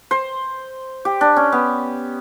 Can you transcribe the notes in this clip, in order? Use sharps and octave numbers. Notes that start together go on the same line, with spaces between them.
C5
G4
D4
C#4
B3